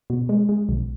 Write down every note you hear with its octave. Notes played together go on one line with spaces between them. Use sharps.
B2
G#3
G#3
B1